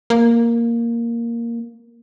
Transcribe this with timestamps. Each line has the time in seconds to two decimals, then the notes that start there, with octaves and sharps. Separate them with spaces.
0.10 A#3